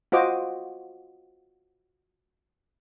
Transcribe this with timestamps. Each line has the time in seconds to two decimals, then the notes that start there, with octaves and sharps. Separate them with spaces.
0.12 F4 F#4 C5 D#5 D6